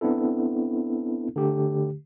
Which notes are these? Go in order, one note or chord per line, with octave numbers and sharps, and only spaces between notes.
B3 C4 D4 E4 A4
D3 A3 G4